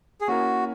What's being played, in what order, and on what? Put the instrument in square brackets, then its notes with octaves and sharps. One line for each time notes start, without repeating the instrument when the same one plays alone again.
[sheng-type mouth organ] G#4
[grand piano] A#3 C#4 E4 A#4 [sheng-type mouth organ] F#4